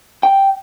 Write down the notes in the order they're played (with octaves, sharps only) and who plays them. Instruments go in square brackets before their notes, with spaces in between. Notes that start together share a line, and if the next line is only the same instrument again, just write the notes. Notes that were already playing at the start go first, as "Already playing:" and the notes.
[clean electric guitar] G5